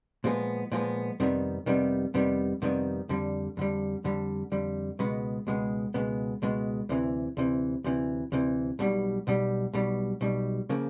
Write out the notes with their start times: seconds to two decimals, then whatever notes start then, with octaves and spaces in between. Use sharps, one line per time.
0.24 A#2 F3 G#3 B3
0.72 A#2 F3 G#3 B3
1.20 F2 C3 D#3 G3 B3
1.66 F2 C3 D#3 G3 B3
2.14 F2 C3 D#3 G3 B3
2.62 F2 C3 D#3 G3 B3
3.09 F2 D3 G3
3.57 F2 D3 G3
4.04 F2 D3 G3
4.52 F2 D3 G3
4.99 C#2 B2 G#3 B3
5.47 C#2 B2 G#3 B3
5.94 C#2 B2 G#3 B3
6.42 C#2 B2 G#3 B3
6.89 D2 C3 E3
7.37 D2 C3 E3
7.84 D2 C3 E3
8.32 D2 C3 E3
8.79 B1 B2 G3
9.27 B1 B2 G3
9.73 B1 B2 G3
10.21 B1 B2 G3
10.69 C#3 F3 A#3